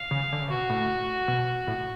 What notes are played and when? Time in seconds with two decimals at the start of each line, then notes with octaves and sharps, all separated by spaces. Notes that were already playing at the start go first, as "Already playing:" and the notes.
Already playing: F5
0.11 C#3
0.32 D3
0.41 C#3
0.50 B2 F#4
0.70 A2
1.28 B2
1.67 A2